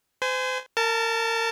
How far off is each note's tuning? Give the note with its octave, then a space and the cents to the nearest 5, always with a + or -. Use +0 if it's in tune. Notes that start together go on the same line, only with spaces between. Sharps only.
C5 -35 G#5 +0
A#4 -30 A5 +0